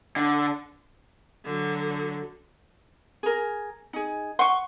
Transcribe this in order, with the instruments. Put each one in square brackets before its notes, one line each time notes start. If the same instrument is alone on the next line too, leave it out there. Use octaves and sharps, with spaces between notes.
[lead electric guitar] D3
[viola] D3 F#3
[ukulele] G#4 A#4
D#4 G#4
[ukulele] F#5 [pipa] C6 C#6